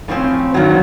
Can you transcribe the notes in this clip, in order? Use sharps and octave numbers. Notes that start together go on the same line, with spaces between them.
A2 F3 A3 C4 C#4
G2 D#3 F#3